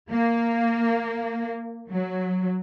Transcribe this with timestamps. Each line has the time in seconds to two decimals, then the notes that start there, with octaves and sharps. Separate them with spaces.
0.11 A#3
1.90 F#3